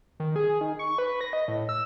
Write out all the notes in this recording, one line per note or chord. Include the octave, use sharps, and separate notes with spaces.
D#3
G#4
G#4
D#3
C#6
B4
A#6
D#5
A2
E6